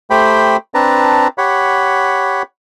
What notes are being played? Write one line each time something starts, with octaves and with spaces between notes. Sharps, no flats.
A3 G4 C5 G5 B5
C4 D4 B4 A5 A#5
G4 C#5 F#5 B5